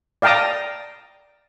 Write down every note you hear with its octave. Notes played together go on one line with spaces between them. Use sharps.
D5 F5 G5 A5 A#5 D#6